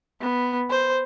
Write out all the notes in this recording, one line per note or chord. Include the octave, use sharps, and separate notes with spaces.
B3
C5